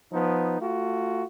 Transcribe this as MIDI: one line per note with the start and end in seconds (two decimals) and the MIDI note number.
0.12 0.56 53
0.12 0.56 59
0.12 0.56 63
0.60 1.22 57
0.60 1.22 65
0.60 1.22 66